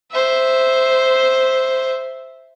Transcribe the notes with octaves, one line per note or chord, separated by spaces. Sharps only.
C5 E5